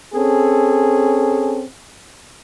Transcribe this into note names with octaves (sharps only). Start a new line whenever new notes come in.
C4 C#4 G#4 A4